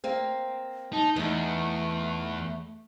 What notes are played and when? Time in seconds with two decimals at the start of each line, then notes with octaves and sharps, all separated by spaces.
0.04 A#3 C4
0.93 D#4 A5
1.16 E2 A3 B3 D#4